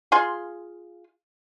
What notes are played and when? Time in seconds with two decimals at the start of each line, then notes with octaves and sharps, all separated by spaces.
0.12 F4 G#4 C6